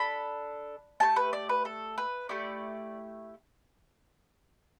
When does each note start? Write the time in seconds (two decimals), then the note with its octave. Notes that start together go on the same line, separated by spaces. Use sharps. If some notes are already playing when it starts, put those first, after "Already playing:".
Already playing: D4 A4 B5
1.00 A3 C4 G4 A5
1.16 B4
1.33 D5
1.49 B4
1.65 A4
1.98 B4
2.29 A3 E4 G4 D5